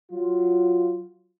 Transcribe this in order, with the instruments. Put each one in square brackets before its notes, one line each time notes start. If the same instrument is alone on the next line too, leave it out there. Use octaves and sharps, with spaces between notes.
[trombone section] F#3 F4